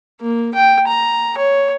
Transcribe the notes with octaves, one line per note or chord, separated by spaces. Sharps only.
A#3
G5
A#5
C#5